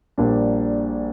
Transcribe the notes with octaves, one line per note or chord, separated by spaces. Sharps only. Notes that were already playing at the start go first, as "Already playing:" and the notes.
A#1 A#2 G3 D4